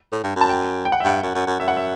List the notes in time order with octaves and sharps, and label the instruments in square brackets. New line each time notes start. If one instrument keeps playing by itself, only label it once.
[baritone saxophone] A2
G2
F#2
[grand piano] A5
G5
G5
F#5
E5
[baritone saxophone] G2 [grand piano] F#5
[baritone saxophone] F#2
F#2
F#2
[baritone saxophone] F#2 [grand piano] E5
[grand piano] F#5
E5